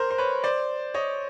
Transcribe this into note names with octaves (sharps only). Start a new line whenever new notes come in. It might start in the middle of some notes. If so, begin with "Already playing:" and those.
Already playing: A#4 C5
C5
B4 C#5
C5 D5
C#5 D#5